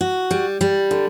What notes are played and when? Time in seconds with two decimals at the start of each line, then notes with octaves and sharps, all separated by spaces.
0.01 F#4
0.31 G3
0.61 G3
0.91 D3